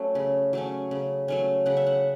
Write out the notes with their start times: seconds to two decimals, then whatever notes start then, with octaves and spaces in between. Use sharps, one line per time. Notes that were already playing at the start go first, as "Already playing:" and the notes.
Already playing: F#3 A3 C#4
0.15 C#3
0.53 F#3 A3 C#4
0.91 C#3
1.28 F#3 A3 C#4
1.66 C#3 F#5
1.77 E5
1.87 F#5